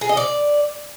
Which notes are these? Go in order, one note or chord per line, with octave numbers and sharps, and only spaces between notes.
G#4
D#5
D5